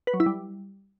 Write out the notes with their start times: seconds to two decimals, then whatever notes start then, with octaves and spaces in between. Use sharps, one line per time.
0.07 B4
0.14 F#3
0.20 E4
0.26 G3